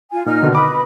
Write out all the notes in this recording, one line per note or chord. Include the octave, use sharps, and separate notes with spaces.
F4 G#5
A#2 D#4 F6
B2 D3 D#3
B4 D#5 B5 D6 D#6